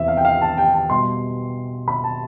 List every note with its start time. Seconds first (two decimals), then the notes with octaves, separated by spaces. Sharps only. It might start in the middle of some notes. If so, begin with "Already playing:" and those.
Already playing: E2 C3 E5
0.08 F5
0.17 G5
0.25 F5
0.41 A5
0.58 G5
0.74 A5
0.90 B2 G3 C6
1.88 B5
2.04 A5